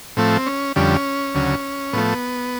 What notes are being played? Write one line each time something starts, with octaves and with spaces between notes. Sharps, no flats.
A2 F3 A3 C4
C#4
F2 D3 G3 C#4
D2 C#3 F#3
A2 F3 A3 B3